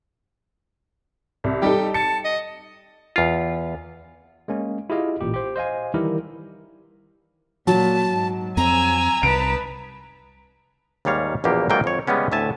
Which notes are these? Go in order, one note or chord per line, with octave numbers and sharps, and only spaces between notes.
C2
G3 D#4 G4 A4
A5 C#7
D#5
E2 F4
G#3 A#3 C#4
E4 F4 G4 G#4 D#5 F5
A1 A#2 G4
G4 C5
C5 D#5 F5 G#5
D#3 E3 G3 E4 G4 A#4
A#2 F#3 A5
G#2
F2 C4 G#5 A#5 E6
C2 D#4 B4 A5 D7
D#2 G#2 G3 C#5 F5
A#1 E2 B2 A#3 G4
G#2 F#3 G3 A#3 A4 G5
F2 C#5
C#3 G3 G#3 B3 C#4
D2 A2 E5 G#5 A5